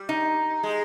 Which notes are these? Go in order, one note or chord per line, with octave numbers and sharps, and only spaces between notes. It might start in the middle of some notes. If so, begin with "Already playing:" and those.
Already playing: G3
D#4
G#3